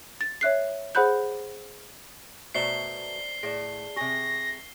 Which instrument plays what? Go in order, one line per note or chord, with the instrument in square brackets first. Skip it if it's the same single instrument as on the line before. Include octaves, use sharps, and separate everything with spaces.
[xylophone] A6
C#5 E5 F#6 C7
G#4 C5 F#5 B5 F#6 G6
[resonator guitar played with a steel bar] B2 A3 E5 [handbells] C5 D5 A#5 [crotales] C7 G7
[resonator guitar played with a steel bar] A2 [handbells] G#4 D5
[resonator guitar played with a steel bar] C3 G#4 [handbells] C#6 [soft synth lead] A#6